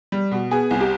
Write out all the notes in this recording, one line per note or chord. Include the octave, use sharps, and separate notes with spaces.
G3
B2
B3 G#4
C2
G4